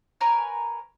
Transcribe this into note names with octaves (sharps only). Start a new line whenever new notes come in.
A#4 B4 C#5 G#5